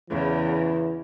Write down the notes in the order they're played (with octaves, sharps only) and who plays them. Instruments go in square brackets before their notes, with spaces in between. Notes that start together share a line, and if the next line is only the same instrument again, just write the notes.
[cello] E2 C#3 [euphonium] E3